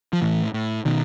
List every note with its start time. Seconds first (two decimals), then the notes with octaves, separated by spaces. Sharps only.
0.13 F3
0.22 A2 E3
0.54 A2
0.85 B2 D#3